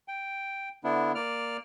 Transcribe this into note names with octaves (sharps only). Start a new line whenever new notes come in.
G5
D3 B3 D4 E4
A#3 D5 F6